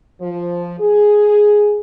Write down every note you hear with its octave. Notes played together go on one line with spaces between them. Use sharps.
F3
G#4